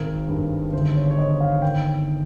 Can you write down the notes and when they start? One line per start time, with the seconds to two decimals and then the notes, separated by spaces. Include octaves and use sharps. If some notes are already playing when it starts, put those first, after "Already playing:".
Already playing: G#1 A#4
0.29 G2
0.73 G1 C5
0.95 C#5
1.11 C#5
1.17 D#3 D#5
1.40 F5
1.62 D#3 G5